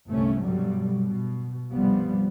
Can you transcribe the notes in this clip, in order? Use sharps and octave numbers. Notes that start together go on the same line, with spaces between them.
G1 C2 C3 A3 C#4
G2 B2 D3 F#3 G3
B2
C2 G2 C3 F3 G3 B3